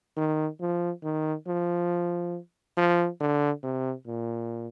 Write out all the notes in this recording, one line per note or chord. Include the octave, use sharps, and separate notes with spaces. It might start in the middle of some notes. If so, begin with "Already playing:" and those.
D#3
F3
D#3
F3
F3
D3
C3
A#2